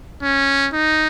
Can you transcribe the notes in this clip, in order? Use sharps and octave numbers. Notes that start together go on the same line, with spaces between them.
C#4
D#4